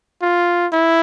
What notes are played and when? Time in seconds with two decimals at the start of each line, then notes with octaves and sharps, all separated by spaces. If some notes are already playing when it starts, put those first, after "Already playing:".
0.22 F4
0.72 E4